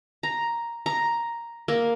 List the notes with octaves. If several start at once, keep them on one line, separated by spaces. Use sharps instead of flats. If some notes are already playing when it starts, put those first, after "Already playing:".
A#5
A#5
A#3